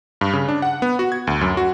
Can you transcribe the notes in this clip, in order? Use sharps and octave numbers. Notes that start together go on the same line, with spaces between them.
G2
C#3
D4
F#5
B3
F#4
G#6
D2
F#2
F#4